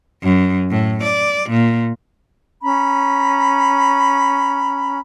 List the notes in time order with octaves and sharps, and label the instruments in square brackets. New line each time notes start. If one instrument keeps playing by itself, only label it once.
[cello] F#2
A2
D5
A#2
[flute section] C#4 A#5 B5